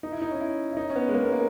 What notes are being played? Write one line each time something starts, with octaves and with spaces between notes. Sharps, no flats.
D#4
E4
D#4
C#4
E4
E4
D#4
C#4
B3
G#3
A#3
B3
A#3